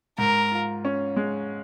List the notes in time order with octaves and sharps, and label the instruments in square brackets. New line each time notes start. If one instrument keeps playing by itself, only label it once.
[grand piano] G#2 [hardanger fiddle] A#4
[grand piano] F4
C#4
G#3